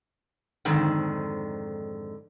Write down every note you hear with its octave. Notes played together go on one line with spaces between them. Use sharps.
F2 G#2 D3 D#3